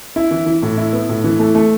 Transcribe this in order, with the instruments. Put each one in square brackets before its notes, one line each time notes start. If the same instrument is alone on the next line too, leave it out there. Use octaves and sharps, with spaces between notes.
[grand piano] E4
E3
E3
A2
E4
B3
A2
E3
A3
A3